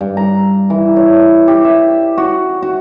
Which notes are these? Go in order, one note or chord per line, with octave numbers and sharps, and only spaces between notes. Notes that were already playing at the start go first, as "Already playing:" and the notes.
G2
A#5
E3
C#5
G4
E5
F#4
F#4